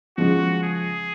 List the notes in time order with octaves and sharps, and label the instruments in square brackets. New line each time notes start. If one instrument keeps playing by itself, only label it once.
[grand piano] C#3 F3 G#3 [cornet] F#4
[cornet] G#4